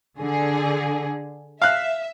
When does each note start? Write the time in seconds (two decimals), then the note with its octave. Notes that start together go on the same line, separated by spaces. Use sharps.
0.20 D3 G#4
1.62 E5 F5 F#6